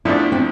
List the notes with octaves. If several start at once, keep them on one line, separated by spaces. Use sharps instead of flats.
E2 D3 F3 A3 D4 E4
C4